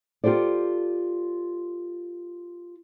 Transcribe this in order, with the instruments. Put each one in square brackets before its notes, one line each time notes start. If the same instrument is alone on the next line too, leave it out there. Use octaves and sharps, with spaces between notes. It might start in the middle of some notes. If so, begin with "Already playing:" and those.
[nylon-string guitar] F4 G4 A4 C5 D5